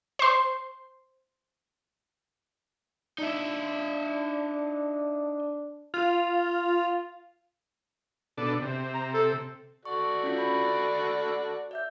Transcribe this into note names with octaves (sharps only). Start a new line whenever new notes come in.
C5 C6
D4 D#4 E5
F4
B2 D4 A4
C3
A#5
A4
F#4 A4 D5 C#6
C#4 F4
B5
D5 E5 G6